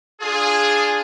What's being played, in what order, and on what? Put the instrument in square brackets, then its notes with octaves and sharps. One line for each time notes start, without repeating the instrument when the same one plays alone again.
[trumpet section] D4 F4 G#4